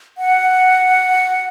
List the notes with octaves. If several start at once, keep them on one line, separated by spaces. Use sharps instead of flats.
F#5